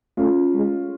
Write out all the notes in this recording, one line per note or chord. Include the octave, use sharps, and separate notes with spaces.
A3 C#4 F4
G#3